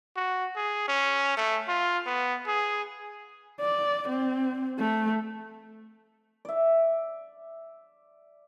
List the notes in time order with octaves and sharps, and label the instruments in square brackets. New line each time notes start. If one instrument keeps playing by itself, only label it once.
[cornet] F#4
G#4
C#4
A3
F4
B3
G#4
[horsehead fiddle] D5
C4
A3
[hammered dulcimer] D5 E5